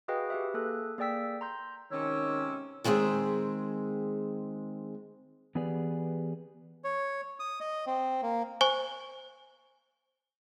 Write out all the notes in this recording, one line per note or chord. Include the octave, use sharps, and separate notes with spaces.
F#4 G#4 B4 D#5 F5 G5
G4 B4 E5
A#3 G#4 A4 F#6
A#3 G#4 D5 G5 E6 B6
A#5 C6 G6
C3 D#3 G#3 C#4 C#5 E6
D#3 G#3 C4 G#4 E5
E3 B3 G4 G#4 B4 D5
C#5
D#6
D#5
C4
A#3
C5 G#5 C#6